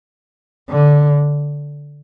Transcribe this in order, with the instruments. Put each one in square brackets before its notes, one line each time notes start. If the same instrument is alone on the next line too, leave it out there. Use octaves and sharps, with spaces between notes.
[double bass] D3